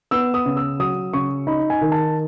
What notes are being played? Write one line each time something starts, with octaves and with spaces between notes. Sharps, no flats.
B3 E6
D#6
C#3
E6
F#3 D#6
C#3 C#6
D#4 B5
G#5
D#3
A5